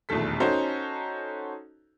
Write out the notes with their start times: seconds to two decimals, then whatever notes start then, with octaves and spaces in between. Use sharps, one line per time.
0.09 E1 A#1 D#2 A3 A4 B6
0.40 C#4 D#4 F#4 A4 C5 A#5